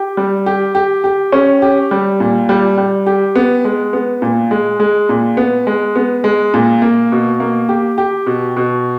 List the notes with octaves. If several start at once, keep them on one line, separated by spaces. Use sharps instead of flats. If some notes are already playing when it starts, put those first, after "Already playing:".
Already playing: G4
G3
G4
G4
G4
C#4
G4
G3
A#2
G3
G3
G4
B3
G#3
B3
A#2
G#3
G#3
A#2
B3
G#3
B3
G#3
A#2
A#3
B2
A#3
G4
G4
B2
B2